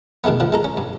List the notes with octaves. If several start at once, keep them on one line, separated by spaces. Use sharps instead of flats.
B2 D#3 G#3 A3 B3
D3 F3
G#3 A4 A#5
C#4
G2